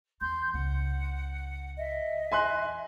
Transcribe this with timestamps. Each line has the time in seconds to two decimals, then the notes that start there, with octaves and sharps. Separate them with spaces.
0.21 E2 C6 G6
0.54 C#2 C#3 F#5
1.78 D#5 E5
2.32 E2 G#5 C6 F#6